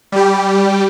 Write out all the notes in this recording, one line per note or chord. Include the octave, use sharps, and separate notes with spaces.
G3 G4